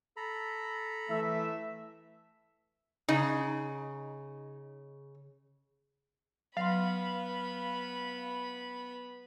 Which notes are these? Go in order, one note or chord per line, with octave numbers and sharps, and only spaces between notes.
A4 A#5 B5
E3 A3 E5
C#3 D#4
F#3 B3 F5 B5 C6